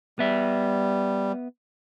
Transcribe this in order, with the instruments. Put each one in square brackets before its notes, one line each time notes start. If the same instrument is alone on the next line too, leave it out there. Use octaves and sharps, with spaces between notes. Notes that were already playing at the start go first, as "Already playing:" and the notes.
[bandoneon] G3 [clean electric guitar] B3 E5